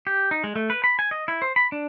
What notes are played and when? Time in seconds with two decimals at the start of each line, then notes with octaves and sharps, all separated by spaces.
0.07 G4
0.31 D#4
0.44 G#3
0.56 A3
0.70 B4
0.84 B5
0.99 G#5
1.11 D#5
1.28 E4
1.42 C5
1.56 B5
1.72 D4